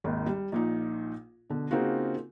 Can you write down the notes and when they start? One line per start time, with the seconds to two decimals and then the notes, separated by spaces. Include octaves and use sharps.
0.04 G#1 D#2 D#3
0.27 G3
0.52 A#1 A#2 D#4
1.50 B2 D3
1.71 C#3 A#3 C4 D#4 F4 F#4